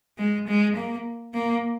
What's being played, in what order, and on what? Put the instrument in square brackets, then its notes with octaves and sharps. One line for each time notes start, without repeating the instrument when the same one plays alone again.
[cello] G#3
G#3
A#3
A#3